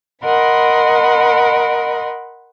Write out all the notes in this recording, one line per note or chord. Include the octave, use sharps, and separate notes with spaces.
A#4 D#5 F#5 B5 C6